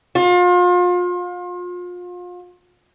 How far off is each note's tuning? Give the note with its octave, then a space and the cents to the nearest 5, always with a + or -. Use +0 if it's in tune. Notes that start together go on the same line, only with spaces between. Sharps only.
F4 +35